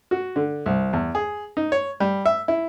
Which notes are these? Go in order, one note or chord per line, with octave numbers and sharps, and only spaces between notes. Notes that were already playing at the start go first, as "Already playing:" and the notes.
F#4
D3
C2
E2
G#4
D#4
C#5
G3
E5
E4